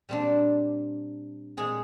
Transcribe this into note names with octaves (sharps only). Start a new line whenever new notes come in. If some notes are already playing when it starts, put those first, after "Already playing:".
A#2 G3 C4 D4
A#2 G#3 C4 G#4